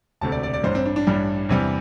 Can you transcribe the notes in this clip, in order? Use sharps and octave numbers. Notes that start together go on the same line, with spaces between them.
E1 D2 C3 A3 A5
D5
D5
D5
A1 G2 G3 C5
C4
D4
D4
A1 G2 G3
E2 C3 E3 G3